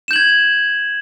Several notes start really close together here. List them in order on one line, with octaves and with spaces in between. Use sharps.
E7 G6 F#7 G#6